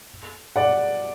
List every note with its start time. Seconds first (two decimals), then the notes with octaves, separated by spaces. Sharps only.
0.56 D5 F#5